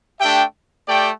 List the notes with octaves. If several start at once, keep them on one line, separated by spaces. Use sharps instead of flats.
A3 D4 G4 E5 G5
A3 G4 D5 G5